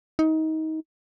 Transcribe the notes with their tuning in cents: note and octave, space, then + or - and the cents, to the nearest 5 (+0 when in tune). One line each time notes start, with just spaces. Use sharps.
D#4 +25